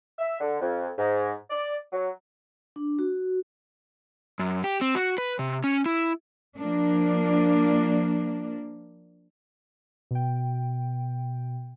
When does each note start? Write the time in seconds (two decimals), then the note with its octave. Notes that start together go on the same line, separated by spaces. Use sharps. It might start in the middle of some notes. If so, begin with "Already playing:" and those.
0.18 E5
0.40 D3
0.60 F2
0.98 G#2
1.51 D5
1.92 F#3
2.76 D4
2.99 F#4
4.39 F#2
4.64 G4
4.81 C4
4.95 F#4
5.18 B4
5.39 C3
5.64 C#4
5.86 E4
6.57 F3 A#3 D4
10.11 B2 G5